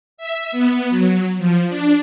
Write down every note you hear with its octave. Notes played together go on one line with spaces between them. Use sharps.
E5
B3
F#3
F3
D4